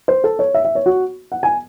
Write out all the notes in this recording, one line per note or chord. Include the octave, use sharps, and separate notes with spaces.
C5
A4
C#5
E5
E5
C#5
F#4
F#5
G#5